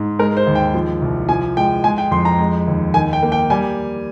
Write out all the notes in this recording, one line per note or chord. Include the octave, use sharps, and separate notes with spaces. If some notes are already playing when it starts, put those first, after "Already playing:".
Already playing: G#2
G#3 A#4
C5
D#2
G5
F3
C2
F3 G#5
G#3 G5
G#3 G#5
G5
F2 C6
A#5
G#3
D#2
D#3 G#5
G5
A#3
G5
G3 G#5